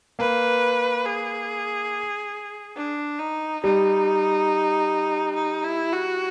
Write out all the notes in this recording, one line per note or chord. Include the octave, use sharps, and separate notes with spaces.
A#3 B4
G#4
D4
D#4
G3 D#4
D#4
E4
F#4